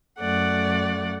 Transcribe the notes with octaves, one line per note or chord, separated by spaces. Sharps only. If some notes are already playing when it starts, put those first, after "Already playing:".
F#2 A3 D5 F#5